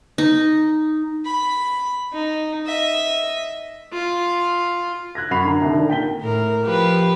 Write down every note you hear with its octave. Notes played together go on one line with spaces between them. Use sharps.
D#4
B5
D#4
D#5 E5
F4
F#6 G#6 A#6
F#2 F#5 B5 C#6 C7 F7
D3 A#5
C2 D3 D#3
D#3 D#4
A#2 G5 B6 G7
A2 A#4
F3 G4 B4